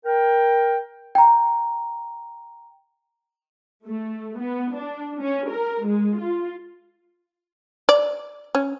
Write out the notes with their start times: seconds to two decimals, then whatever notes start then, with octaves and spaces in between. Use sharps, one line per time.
0.06 A#4 G5
1.15 G5 A#5
3.87 A3
4.40 B3
4.76 D4
5.21 C#4
5.51 A#4
5.86 G#3
6.20 F4
7.89 D5
8.55 C#4